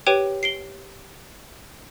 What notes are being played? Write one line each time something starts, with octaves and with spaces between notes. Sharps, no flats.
G4 B4 C#5 G5 D7 D#7
C7 D7 G7